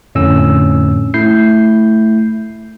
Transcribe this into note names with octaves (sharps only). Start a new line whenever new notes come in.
F2 A2 D3 C#4 E6
A3 E4 G6 C7